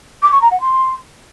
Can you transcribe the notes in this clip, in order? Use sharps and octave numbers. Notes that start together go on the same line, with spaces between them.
D6
C#6
A#5
F#5
C6